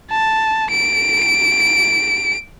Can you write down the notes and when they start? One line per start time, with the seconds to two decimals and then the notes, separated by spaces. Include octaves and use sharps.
0.10 A5
0.71 D7